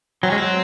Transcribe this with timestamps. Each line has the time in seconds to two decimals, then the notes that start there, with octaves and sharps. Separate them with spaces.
0.23 F#3 C4
0.30 G#3 C#4
0.38 F#3 C4